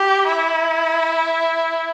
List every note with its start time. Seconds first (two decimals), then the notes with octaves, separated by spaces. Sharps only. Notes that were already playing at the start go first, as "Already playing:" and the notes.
Already playing: G4
0.27 E4